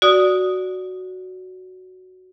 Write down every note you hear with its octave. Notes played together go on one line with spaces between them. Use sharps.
F#4 D5 D#6